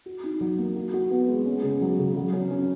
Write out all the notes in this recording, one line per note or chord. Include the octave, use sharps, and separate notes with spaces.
F#4
D#4
F#3
A#3
F#4
F#4
B3
G#3
C#4
C#3
F#3
C#3
F#3
C#4
C#4